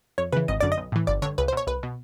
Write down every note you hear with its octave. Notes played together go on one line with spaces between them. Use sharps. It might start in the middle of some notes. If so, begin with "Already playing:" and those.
F2 C#5
C#3 E3 B4
G#1 D#5
F#2 D3 D5
D#5
B1
A2 E3
G1 D5
G2 D3 C#5
C#2 B4
C5
B2 C#5
C2 B4
B2